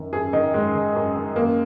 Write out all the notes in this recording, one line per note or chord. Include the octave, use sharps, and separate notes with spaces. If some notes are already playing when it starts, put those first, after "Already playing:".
Already playing: F#2 D#3
F#2 G#4
D#3 D#4
F#2 G#3
D#3
F#2
D#3
F#2 A#3